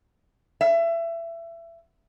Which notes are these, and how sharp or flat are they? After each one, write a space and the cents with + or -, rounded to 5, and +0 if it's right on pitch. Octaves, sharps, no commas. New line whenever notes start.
E5 +25